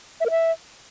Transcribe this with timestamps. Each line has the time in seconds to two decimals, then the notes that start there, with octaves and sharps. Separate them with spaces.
0.21 E5
0.26 A#4
0.31 E5